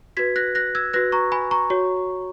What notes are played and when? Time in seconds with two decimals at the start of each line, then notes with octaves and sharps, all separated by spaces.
0.17 F#4 B4 G#6 B6
0.36 F#6 A#6
0.55 F#6 A#6
0.75 E6 G#6
0.93 F#4 B4 F#6 A#6
1.12 A#5 C#6
1.32 G#5 B5
1.51 A#5 C#6
1.70 F#4 C#5